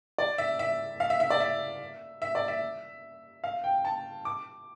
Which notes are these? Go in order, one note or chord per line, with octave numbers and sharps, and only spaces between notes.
D5
E5
E5
F5
E5
E5
D5
E5
E5
D5
E5
F5
G5
A5
D6